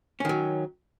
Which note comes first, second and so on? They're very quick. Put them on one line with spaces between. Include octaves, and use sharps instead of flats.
C#4 D#3 F#3